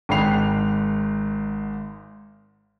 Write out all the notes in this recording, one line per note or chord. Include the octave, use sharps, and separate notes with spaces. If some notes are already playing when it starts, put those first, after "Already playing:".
G#1 G#2 G5 B5 C7 F7